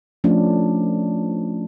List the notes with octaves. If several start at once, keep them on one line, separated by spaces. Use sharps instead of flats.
F3 A3 C#4 D4